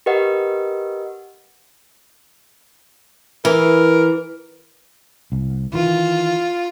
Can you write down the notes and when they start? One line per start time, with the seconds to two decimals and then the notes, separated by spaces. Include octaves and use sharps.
0.06 G4 A#4 B4 D#5 F#5
3.45 E3 A#4
5.32 C2
5.73 D#3 E3 F4